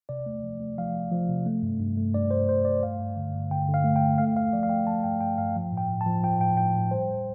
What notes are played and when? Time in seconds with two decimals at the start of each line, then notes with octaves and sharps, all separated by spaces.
0.09 C3 D5
0.26 A3
0.43 F3
0.60 A3
0.78 F3 F5
0.95 F3
1.11 F3
1.29 C3
1.46 A3
1.62 G2
1.80 G2
1.97 A3
2.14 G2 D5
2.31 A3 C5
2.49 G2 C5
2.65 G2 D5
2.82 A3 F5
3.00 G2
3.17 D3
3.33 G2
3.51 D3 G5
3.68 D3
3.74 F5
3.84 A3
3.96 G5
4.02 A3
4.18 A3 F5
4.36 A3 F5
4.53 F3 D5
4.63 F5
4.69 A3 G5
4.87 F3 A5
5.04 G2 G5
5.21 G2 G5
5.38 G2 F5
5.56 F3
5.72 A2
5.78 G5
5.89 A2
6.01 A5
6.06 F3
6.23 F3 G5
6.41 A2 G5
6.57 A2 G5
6.75 A2
6.91 G3 C5